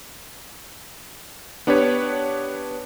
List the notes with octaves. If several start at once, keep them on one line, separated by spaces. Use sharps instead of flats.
B3 D4 G4 B4 C#5